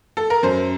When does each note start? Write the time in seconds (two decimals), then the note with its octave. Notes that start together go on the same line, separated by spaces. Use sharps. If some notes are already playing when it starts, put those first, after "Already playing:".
0.17 A4
0.30 A#4
0.43 F#2 C5